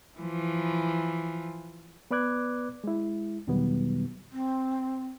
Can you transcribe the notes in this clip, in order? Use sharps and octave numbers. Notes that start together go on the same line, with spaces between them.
E3 F3
B3 B4 D5 D6 F#6 G#6
G#3 E4
E2 B2 D#3 F#3 G3 B3
C4